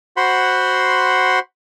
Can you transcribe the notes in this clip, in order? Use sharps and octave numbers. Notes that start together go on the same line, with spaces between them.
F#4 C5 F#5 B5 C6